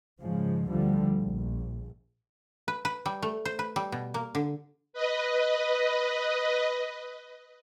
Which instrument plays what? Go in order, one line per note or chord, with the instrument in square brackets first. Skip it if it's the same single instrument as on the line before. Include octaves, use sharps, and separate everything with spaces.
[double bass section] G#2 C#3 F3 G#3
D2 D3 F3 G3
A#1
[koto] B4
B4
G3
A3
C5
B4
G3
B2
A#3
D3
[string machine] B4 D#5